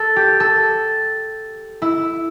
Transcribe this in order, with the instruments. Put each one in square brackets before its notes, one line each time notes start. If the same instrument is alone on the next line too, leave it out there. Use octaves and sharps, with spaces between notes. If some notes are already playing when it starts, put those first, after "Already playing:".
Already playing: [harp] A4
G4
A4
E4